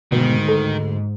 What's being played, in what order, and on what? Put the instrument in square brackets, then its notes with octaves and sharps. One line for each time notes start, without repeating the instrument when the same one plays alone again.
[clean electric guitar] D2 [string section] G#2 [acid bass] B2 [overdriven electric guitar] D#3
[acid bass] A4